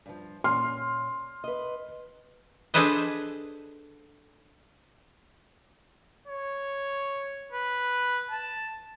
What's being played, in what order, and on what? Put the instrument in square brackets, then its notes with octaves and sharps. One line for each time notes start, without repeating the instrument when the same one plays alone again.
[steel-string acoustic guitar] G2 F3
[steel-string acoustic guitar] A#2 C#4 [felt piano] C6 F6
[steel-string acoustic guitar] B4 D#5
[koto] D4 G#4 A4 B4 C5 D#5
[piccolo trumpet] C#5
B4
A5